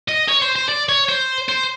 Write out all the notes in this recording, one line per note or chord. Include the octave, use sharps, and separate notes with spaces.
D#5
C#5
C5
C5
D5
C#5
C5
C5